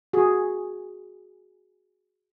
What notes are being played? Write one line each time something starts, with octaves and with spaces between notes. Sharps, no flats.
F#4 G#4